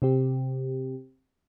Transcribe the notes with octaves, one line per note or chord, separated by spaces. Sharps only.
C3 C4 G4